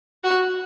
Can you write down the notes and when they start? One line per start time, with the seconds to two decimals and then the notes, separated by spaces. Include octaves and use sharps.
0.24 F#4